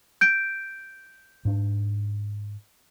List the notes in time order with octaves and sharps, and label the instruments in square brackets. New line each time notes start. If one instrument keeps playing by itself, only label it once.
[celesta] G6 D7
[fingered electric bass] G#2 D4